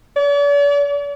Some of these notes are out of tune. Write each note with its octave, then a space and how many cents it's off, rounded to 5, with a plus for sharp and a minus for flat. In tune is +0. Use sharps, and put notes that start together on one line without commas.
D5 -45